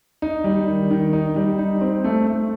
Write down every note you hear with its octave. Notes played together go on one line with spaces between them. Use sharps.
D#4
G3
D#3
D#3
D#4
G3
D#4
C4
A3
A3